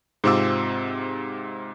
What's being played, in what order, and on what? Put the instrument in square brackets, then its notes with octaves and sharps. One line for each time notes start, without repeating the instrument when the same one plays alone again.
[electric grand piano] G#2 C3 C4 F4 D6 E6